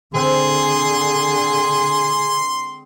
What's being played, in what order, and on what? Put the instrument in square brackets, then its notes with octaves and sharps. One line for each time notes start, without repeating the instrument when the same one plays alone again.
[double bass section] D3 [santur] G#3 C4 [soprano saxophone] G#4 [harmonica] C6